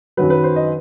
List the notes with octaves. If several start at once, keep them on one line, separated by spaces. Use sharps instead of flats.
F#2 D#3 F#3 B4
B4
C5
D#5